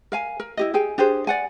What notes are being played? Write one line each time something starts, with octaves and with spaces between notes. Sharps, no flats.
A#4 F5 G#5
A#4
E4 G4 D#5
G4 G#4 G5 G#5
D4 G4 G#4 C5
D5 F#5 G#5